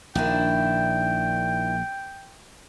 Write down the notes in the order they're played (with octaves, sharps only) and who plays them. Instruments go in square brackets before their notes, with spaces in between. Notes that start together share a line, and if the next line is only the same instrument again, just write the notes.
[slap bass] A#1 [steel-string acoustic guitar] D#3 D4 E4 [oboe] G5